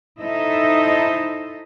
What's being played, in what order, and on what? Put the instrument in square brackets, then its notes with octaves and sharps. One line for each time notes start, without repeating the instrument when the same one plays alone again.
[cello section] D#4 E4 A4 C5 D#5 E5